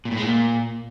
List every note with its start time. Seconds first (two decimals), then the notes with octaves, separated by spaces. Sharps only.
0.05 A#2
0.11 A2
0.17 G#3
0.23 A#2